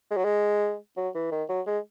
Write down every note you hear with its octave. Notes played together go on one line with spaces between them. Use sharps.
G#3
F#3
G#3
F#3
E3
D#3
F#3
G#3